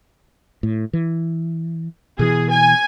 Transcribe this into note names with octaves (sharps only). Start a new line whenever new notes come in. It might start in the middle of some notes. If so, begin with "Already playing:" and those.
A2
E3
B2 E3 G#4
G#5